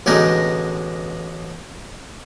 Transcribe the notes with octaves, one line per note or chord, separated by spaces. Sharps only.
A1 B2 D3 G#3 D#4 A#4